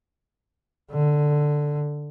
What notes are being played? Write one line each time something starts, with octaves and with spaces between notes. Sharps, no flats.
D3